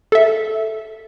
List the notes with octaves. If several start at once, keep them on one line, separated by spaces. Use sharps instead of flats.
A4 E5